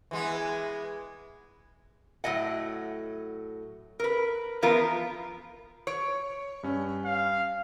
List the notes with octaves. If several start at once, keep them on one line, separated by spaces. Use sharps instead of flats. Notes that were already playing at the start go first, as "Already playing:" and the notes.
E3 G#3 B3
A2 F#3 D#5 F#5
A#4 B4
E3 F3 B3 F4 A#4 B4
C#5 C#6 D7
G2 C#4
F5